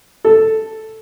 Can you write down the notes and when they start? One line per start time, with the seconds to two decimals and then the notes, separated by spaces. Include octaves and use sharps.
0.25 A4